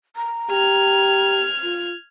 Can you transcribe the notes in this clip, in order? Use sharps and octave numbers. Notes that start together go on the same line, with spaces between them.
A#5
G4 F6 G#6
F4